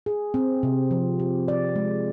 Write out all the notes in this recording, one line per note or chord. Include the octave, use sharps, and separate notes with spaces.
G#4
C4
C3
F3
G4
D5
G#3